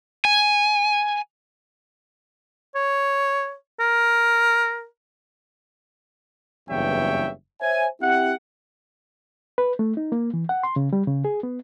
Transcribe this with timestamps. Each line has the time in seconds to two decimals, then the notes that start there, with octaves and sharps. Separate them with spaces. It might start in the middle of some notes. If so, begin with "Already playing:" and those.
0.25 G#5
2.75 C#5
3.80 A#4
6.70 F#1 E2 G2 C#5 E5 G5
7.61 C5 C#5 E5 G#5
8.02 C4 E4 G4 F#5
9.58 B4
9.79 A3
9.97 D#4
10.12 A#3
10.34 E3
10.49 F#5
10.63 C6
10.76 C#3
10.93 G3
11.08 C#3
11.25 G#4
11.43 B3